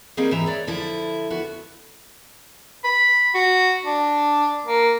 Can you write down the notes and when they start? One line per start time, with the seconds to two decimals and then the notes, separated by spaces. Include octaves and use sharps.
0.17 G3 A#3 C4 D#4 G#4
0.31 G#2 E3 E5 A#5
0.46 C#5 D5
0.67 D3 F3 E4
1.30 B3 F#4
2.84 B5
3.35 F#4
3.85 D4
4.67 A#3